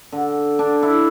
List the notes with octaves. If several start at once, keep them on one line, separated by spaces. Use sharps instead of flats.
D3
D4
E4